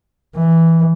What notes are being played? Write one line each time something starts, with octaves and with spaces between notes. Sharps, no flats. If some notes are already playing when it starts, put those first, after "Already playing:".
E3